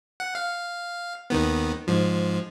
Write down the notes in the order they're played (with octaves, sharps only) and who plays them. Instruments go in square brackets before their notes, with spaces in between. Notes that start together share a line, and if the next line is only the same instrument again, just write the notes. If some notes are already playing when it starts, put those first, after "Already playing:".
[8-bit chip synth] F#5
F5
D#2 D#3 B3
G#2 F3